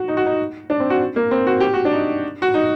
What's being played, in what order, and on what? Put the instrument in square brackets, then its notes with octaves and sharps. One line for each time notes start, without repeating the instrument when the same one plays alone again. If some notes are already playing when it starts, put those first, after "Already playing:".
Already playing: [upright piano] F#4
D#4
F#4
D#4
D4
C4
F#4
A#3
C4
F#4
G4
F#4
D4
D#4
F#4
D#4